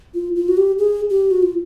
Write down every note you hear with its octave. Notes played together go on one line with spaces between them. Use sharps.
F4
F4
F#4
G4
G#4
G4
F#4
F4